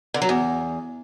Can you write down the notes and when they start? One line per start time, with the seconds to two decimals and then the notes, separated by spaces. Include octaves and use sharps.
0.14 D3
0.22 F#3
0.29 E2